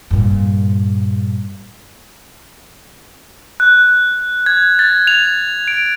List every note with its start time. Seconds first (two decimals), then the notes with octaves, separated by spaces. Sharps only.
0.11 G2 A#2
3.60 F#6
4.46 G#6
4.79 A6
5.07 F7
5.68 D7